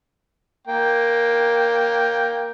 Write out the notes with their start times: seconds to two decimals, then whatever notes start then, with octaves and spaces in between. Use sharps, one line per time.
0.67 A#3 G5